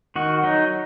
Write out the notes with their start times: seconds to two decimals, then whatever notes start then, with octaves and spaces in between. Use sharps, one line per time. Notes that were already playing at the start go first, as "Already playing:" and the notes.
0.16 D#3 F#4
0.43 F#3 D#4